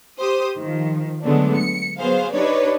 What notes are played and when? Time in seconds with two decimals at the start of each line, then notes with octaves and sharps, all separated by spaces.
0.20 G4 C5 D#6
0.58 D#3 F3
1.22 D3 F#3 G#3 A3 B3 D4
1.57 C#7
1.99 F#3 B3 G#4 C5 F5
2.33 D4 D#4 G4 B4 C#5 D5